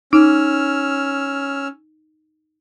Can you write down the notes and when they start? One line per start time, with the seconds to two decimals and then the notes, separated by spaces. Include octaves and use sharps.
0.13 C#4 D#4 E6 F6